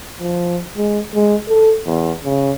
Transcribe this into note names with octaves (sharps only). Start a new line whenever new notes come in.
F3
G#3
G#3
A4
E2
C#3